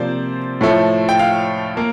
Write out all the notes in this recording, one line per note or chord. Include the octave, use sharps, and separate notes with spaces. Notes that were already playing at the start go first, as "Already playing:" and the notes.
Already playing: C3 F3 A#3 C5 D5
A2 F3 A3
G5
F5
A#3